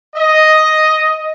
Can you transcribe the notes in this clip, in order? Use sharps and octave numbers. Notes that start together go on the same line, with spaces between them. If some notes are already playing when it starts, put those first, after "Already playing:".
D#5